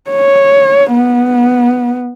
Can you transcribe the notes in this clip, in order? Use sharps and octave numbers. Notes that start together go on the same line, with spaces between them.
C#5
B3